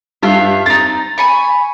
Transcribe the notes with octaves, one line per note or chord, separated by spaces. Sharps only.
G2 F4 E5
C4 D#4 A6
G#5 B5 C#6